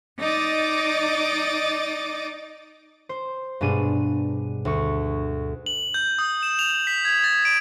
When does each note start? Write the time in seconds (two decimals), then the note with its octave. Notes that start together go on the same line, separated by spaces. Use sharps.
0.19 D#4 D5 D#5 D6 A6
3.09 C5
3.61 G2 B2 G#3 D4 D#7
4.65 D2 C#6
5.66 F#7
5.94 G6
6.19 D#6
6.43 E7
6.59 F7
6.87 B6
7.05 G#6
7.24 A6
7.45 D7